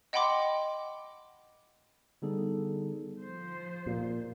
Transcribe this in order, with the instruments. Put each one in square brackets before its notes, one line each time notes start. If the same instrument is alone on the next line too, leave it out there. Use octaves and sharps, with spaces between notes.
[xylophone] D#5 F#5 G5 B5 C6 D6
[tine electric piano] D3 G3 B3 D#4 G#4 A4
[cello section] F3 C5
[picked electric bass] A#2